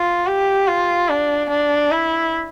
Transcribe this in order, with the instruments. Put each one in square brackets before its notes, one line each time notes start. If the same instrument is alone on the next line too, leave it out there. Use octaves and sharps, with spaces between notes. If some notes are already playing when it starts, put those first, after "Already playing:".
Already playing: [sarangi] F4
G4
F4
D4
D4
E4